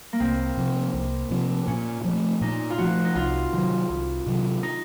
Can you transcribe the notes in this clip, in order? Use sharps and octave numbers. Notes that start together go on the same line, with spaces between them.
A#3
C2 C4
C3 F3
C2
C3 F3
A#2 C#4
F3 A3
A#2 D#4
F4
F3 A3 F#4
D#4
C2 F4
C3 D#3 F#3
C2
C3 D#3 F#3
D#4